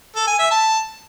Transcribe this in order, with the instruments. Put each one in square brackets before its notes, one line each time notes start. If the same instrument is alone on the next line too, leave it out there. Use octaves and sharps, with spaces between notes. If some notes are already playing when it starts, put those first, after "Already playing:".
[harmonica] A4
G#5
E5
A5